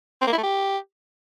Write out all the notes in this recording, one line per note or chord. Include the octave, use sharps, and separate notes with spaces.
C4
A#3
E4
A3
G4